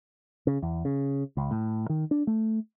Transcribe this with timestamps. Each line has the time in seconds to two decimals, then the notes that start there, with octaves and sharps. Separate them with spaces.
0.47 C#3
0.62 E2
0.85 C#3
1.37 C#2
1.51 A2
1.90 D#3
2.11 D4
2.27 A3